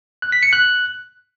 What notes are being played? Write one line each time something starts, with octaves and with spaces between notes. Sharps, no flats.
F#6
B6
C#7
F#6